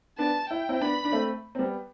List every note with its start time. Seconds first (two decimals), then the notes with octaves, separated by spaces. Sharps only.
0.18 B3 D4 A5
0.49 E4 G5
0.69 C4 E4
0.81 B3 D4 B5
1.05 D4
1.12 A3 C4
1.55 C4
1.59 G3 B3